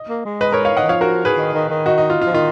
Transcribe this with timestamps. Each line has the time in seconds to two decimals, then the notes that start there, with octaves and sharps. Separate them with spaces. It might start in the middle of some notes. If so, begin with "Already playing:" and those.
Already playing: D#5
0.09 A#3
0.25 G#3
0.41 B4 D#5
0.52 A#4 C#5
0.65 C#5 F5
0.77 D#5 F#5
0.83 D#3
0.89 F3 C#5 F5
1.01 F#4 A#4
1.25 G#4 B4
1.38 D#3
1.54 D#3
1.70 D#3
1.86 D#4 F#4
1.98 D#4
2.10 F4
2.22 F4
2.27 F3
2.34 D#3 F4